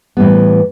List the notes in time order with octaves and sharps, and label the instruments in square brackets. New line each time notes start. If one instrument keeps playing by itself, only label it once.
[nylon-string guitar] A2 E3 G3 B3